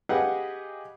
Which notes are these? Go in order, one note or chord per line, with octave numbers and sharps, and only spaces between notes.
G4 G#4 B4 D#5 F5 F#5